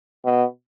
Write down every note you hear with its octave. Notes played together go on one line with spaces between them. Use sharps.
B2